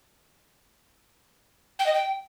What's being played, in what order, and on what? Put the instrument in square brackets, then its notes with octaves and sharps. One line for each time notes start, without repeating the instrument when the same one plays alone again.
[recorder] G5
D#5
G5